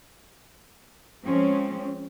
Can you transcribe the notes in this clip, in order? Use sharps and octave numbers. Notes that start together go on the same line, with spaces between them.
F3 G#3 C4 C#4